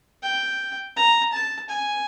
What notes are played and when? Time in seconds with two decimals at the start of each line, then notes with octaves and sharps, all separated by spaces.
0.23 G5
0.96 A#5
1.33 A5
1.70 G#5